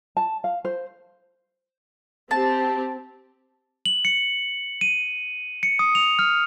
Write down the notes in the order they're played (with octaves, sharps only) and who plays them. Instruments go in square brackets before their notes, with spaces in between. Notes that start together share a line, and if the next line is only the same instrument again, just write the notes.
[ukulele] A5
F5
C5
[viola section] C4 G4 [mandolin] A5
[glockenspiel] F#7
C#7
D#7
C#7
D#6
F7
F6